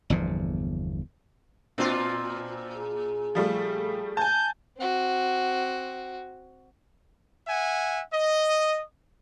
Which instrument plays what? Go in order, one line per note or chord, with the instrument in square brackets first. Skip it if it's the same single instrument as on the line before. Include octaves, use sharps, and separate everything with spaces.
[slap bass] G1 E2 A#2 F3
[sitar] A#2 D4 F4 [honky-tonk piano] C4
[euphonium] G#4
[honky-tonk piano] F3 G3 A3
[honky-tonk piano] G#5 A5 [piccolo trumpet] G6
[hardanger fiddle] C4 F#4
[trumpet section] E5 F#5 G#5
D#5